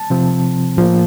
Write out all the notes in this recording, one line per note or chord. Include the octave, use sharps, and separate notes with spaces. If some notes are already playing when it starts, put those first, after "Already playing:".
Already playing: A5
C3 F3 C4
A2 F3 A#3